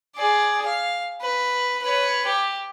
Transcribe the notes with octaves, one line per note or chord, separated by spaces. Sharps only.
G#4 D5
F5
B4
B4 C#5
G4